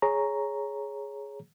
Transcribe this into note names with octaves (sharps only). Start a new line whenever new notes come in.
G#4 C#5 A#5